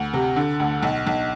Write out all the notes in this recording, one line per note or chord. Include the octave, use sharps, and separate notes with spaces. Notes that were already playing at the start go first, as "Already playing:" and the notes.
Already playing: D2
C3
D3
D2
B1
B1